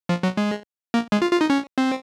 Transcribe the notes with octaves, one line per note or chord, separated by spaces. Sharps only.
F3
F#3
G#3
A#3
G#3
F4
F4
D#4
C#4
C4